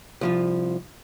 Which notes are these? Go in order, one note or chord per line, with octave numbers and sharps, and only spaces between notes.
C2 F3 F4